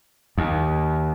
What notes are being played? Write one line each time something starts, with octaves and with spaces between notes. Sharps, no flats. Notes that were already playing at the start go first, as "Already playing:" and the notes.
D#2